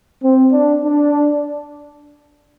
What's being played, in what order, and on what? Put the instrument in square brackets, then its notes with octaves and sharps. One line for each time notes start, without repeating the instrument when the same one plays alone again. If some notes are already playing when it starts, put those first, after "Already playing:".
[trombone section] C4
D4
D4